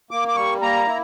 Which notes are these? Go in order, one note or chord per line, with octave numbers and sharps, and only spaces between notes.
A#3 D6
D6
G3 C#6
A#3 A#5
E4